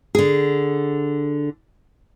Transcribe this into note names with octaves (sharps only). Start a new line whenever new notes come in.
D3 G#4